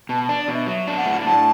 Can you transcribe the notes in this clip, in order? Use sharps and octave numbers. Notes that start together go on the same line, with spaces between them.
B2 A5
A5
D4
D5
B2
E5
F#3 E5
D4
F#5
A2
A2 A5